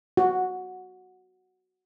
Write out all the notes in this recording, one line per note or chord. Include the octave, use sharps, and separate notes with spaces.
F#4